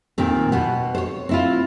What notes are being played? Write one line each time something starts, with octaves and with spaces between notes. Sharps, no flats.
D#2 A#2 D#3 C4
B2 B3 F#5
C5 C#5
C4 E4 F4